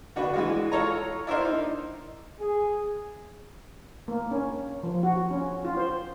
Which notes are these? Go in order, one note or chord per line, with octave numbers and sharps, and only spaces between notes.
D3 D4 F#4 B4
E3 G#3 F#4
F4 A4 C#5 A#5
D4 E4 A#4 C5
D#4
G#4
A#3
C#4
F3
F#4
C#4
F4
C5